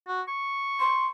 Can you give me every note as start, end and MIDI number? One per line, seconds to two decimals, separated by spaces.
0.08 0.22 66
0.28 1.10 85
0.80 1.07 84